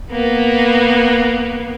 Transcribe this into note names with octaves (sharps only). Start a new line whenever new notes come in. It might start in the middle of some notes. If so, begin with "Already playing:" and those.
A#3 B3